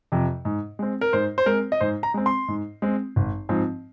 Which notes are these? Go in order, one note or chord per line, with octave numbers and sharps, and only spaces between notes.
F2 C3
G#2
G#3 C4
A#4
G#2 C5
C5
G#3 C4 A#4
D#5
G#2 C5
A#5
G#3 C4
C6
G#2
G#3 C4
G#1
G#2 F3 C4